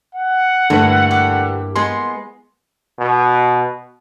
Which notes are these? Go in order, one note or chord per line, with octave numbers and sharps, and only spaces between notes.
F#5
G2 D3 A3 A#3 E4 B4
G4
G#3 B3 G#4 C6
B2